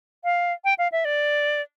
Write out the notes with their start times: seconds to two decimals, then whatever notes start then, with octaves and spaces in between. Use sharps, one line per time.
0.24 F5
0.64 G5
0.78 F5
0.92 E5
1.05 D5